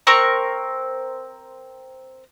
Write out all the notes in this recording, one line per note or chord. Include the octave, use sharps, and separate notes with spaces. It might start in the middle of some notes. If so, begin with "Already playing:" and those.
C4 A#4 C#6